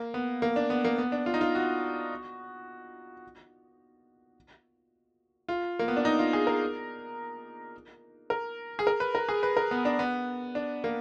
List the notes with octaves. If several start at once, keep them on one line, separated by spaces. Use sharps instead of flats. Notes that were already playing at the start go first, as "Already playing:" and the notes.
Already playing: A#3
B3
A#3
D4
B3
A#3
B3
D4
F4
D#4
F4
F#4
F4
A#3
B3
D4
D#4
F4
G#4
A#4
A#4
G#4
A#4
B4
A#4
G#4
B4
A#4
B3
D4
B3
D4
A#3